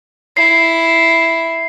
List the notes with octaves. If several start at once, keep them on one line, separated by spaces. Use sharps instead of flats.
E4 C7